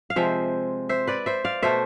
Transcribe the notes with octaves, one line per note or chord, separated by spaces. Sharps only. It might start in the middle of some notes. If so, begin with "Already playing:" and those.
F5
C3 F3 G#3 C5 E5
C5 E5
B4 D5
C5 E5
D5 F5
B2 A3 C5 E5